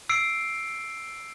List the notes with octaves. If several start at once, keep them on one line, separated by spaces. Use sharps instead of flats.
E6 C7 D7